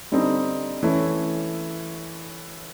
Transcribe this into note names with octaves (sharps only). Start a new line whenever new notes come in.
D3 G3 C4 D#4
E3 A3 C#4 E4